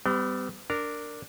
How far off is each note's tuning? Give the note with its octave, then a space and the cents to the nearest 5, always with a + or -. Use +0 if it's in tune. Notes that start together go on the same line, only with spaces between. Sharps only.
G3 +0 B3 +45
D4 +0 A#4 -15